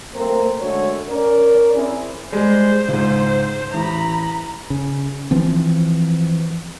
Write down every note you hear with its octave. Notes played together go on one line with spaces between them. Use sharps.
F#3 A3 A#3 C4 A#4
F#2 D3 G#3 A3 F#4 C#5
C#4 A#4 D5
C4 E4 G#4
G3 G#3 C5
C#2 G#2
A1 A#5 B5
C#3
E3 F3 C4